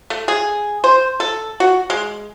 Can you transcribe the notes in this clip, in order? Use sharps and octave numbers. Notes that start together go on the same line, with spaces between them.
A3
G#4
C5
A4
F#4
G#3